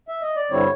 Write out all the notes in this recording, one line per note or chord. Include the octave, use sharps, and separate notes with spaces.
E5
D#5
D5
G2 D3 G3 C4 E4 C#5